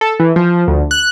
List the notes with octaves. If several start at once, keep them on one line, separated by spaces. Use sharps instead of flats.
A4
E3
F3
D2
F#6